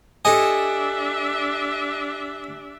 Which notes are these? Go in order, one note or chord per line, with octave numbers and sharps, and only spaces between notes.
D4 G4 A4 D#5 E5 G#5